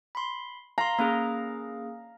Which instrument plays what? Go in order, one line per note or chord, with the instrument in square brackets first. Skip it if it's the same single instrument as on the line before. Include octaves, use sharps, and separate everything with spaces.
[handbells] B5 C6
[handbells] F5 C6 [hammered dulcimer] A#5
[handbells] A#3 C#4 G#4 [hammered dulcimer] F5